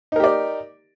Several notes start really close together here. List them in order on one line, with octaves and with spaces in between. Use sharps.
D#4 A#4 G4 D5